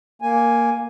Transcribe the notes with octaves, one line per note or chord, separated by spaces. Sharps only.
A#3 G#5